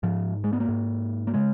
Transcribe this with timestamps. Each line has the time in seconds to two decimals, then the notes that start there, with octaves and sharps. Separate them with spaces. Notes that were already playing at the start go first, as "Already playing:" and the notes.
0.03 G#2 F3
0.44 G#3
0.53 B3
0.60 A#3
0.69 G#2
1.27 A#3
1.34 C#3 G#3